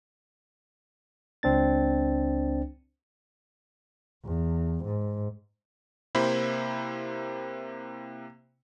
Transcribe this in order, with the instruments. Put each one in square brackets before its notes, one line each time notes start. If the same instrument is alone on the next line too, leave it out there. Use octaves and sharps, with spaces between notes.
[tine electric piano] C#2 C4 D4 A6
[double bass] E2
G#2
[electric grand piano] C3 A#3 E4 C5 B5